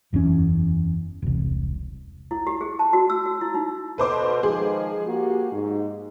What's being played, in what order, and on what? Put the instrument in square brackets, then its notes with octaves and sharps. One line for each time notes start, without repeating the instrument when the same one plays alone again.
[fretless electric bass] F#1 E2 B2 C#4
E1 C2
[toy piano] E4
G4
G#4
A5
F#4
E6
F#4
E4
D#4
[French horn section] B2 A4 [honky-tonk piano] B4 C5 D6
[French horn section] D#3 F3 G#3 [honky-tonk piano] G#4
[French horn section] A#3 F#4 G4
G#2